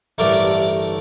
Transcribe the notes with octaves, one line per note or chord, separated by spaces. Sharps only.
A1 G2 D3 A3 A#4 D5